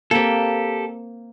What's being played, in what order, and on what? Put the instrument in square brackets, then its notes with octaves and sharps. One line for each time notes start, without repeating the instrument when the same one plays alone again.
[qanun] A#3 C4 [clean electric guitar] G4 A4